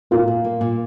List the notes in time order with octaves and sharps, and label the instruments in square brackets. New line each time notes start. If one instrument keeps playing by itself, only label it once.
[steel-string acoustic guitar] A#2 [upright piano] F4 A#4
[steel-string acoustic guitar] A#2
A#3
A#2